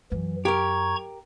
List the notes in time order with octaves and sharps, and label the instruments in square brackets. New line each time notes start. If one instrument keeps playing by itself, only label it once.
[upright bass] F#2 [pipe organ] E3
[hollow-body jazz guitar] G4 A#4 [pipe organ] A#5 C#6 G#6